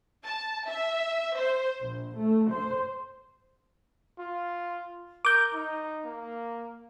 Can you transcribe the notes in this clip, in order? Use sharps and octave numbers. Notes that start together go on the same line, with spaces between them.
A5
E5
C5
A#1
A3
C5
F4
A#4 D6 G6
D#4
A#3